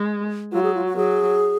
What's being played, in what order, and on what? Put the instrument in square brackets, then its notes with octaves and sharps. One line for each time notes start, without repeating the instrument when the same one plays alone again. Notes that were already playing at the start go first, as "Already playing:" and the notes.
Already playing: [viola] G#3
[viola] F#3 [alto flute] F4
[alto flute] G#4
F4
F#4
[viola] F#3 [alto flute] G#4